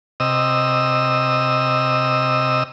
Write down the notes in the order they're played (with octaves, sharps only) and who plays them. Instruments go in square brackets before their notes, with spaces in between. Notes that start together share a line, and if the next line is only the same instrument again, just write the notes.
[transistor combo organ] C3 D#5 E6